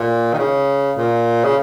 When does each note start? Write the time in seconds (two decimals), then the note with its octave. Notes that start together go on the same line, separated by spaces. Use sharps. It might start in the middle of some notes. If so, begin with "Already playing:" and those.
Already playing: A#2
0.33 D#3
0.38 C#3
0.97 A#2
1.44 C#3